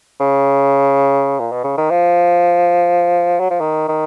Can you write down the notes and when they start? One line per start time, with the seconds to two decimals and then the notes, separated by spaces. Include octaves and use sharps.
0.20 C#3
1.39 A#2
1.52 B2
1.64 C#3
1.77 D#3
1.91 F3
3.40 F#3
3.50 F3
3.60 D#3
3.88 D#3